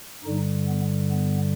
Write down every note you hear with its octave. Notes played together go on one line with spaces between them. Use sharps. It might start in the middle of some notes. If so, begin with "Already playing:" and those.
G2 D3 G3 D#4
B3
B3